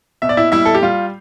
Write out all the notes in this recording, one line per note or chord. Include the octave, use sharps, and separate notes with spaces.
B2 E5
D5
E4 E5
G3 E4 E5
A4
G4
G3 F4